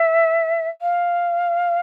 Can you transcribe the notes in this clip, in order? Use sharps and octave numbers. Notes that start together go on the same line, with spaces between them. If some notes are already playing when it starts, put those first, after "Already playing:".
Already playing: E5
F5